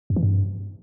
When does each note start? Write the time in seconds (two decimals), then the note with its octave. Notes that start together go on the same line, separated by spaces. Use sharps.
0.10 F#2
0.16 E3
0.23 G2